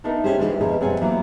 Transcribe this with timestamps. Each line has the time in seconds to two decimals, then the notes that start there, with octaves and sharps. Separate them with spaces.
0.04 A3 B3 D4 D#4 A#4
0.24 C#4 D#4 G4 G#4 C5
0.38 E3 F3 G#3 D4 F4 F#4
0.61 F2 B2 G#4 A#4
0.81 F#2 G3 C4 F#5 G#5
1.01 E3 F#3 G3 A#3 B3 F#4